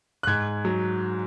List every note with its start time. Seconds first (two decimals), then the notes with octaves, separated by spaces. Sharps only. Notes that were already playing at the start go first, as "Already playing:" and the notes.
0.23 F#6
0.27 G#2 G#6
0.65 F#3